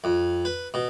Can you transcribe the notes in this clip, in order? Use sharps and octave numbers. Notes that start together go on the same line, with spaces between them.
F2
B4
B2